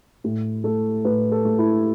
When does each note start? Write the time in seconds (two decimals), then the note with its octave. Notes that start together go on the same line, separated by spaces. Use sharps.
0.24 A2
0.64 A3 A4
1.05 A2 B4
1.32 A4
1.45 A3
1.59 E4